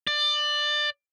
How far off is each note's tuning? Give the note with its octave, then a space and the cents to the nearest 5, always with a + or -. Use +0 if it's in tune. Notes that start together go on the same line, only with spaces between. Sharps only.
D5 +20